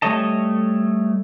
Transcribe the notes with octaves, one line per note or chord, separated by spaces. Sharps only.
G3 A3 C#5 D#5 A5